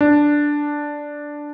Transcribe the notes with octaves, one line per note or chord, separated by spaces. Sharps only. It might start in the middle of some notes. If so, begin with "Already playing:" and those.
D4